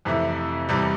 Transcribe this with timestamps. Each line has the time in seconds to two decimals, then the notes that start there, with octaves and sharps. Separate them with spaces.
0.05 F2 C3 E3 A3 E4
0.69 E2 C3 E3 G3